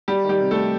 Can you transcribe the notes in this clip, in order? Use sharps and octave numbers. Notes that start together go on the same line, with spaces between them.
G3 G4
D#3
G3 G4
C3
A3 A4